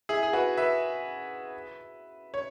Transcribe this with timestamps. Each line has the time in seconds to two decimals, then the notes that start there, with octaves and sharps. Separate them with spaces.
0.09 E4 G#4
0.23 G#4
0.33 F#4 B4
0.57 B4 E5
2.34 C#5